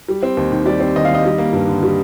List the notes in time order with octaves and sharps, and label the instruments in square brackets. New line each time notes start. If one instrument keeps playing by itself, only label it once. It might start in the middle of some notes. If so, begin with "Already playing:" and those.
[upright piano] G3
C4
D#2
D#3
G3 D5
C4
D#2 D#5
F5
D#3 D#5
G3
A#3
G2
D3
G3